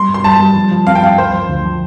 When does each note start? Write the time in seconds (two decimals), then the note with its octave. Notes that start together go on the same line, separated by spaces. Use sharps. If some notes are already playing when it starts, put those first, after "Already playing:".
Already playing: G3 C6
0.09 G2
0.14 C6
0.24 G3 A5
0.40 G3
0.55 F3
0.71 F3
0.87 C4 F5
0.95 G5
1.03 G2 F5
1.18 D2 C5
1.34 F3
1.50 D2
1.65 F3